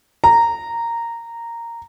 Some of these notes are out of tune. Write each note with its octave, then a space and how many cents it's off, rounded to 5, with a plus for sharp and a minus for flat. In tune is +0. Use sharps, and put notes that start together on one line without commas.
A#5 -10